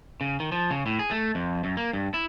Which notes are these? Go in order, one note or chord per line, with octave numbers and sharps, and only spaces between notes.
C#3
D#3
F3
C#3
A2
G#4
A3
F2
F#2
A#3
G2
E4